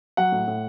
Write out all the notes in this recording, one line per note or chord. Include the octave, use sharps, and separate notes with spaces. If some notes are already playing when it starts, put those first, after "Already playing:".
F#3 F#5
A2
A2